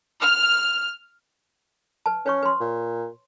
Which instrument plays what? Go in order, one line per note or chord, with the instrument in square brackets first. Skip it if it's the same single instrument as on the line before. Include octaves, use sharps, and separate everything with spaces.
[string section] F6
[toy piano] B4 A5
[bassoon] C#4 [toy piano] B4 C#5 C#6
[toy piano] B4 C6
[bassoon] A#2